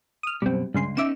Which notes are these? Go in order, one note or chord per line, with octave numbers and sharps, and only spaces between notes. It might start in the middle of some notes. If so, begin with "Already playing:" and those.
D#6 F6
F#2 B2 G3 C4
C#2 G2 C#3 C6
B3 C#4 D#4 E5 D6 E7